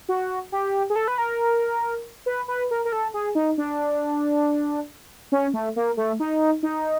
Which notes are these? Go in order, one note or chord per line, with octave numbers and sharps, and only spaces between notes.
F#4
G4
G#4
A4
B4
A#4
B4
B4
A#4
A#4
A4
G#4
D#4
D4
C#4
A3
A#3
A3
D#4
D#4